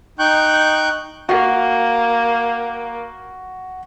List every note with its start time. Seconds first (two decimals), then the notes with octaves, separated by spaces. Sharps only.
0.19 D#4 G5 C#6 F#6 G6
1.29 A#3 F#4